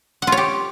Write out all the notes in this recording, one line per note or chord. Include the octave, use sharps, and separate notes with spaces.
F#5
F4
C#5
G4